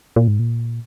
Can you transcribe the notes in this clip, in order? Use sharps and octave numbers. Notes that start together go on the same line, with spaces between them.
A#2
G#2
A#2